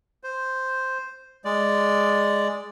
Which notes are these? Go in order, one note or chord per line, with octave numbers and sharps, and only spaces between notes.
C5
G#3 D5